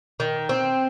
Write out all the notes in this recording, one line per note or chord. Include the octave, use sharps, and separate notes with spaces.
D#3
C4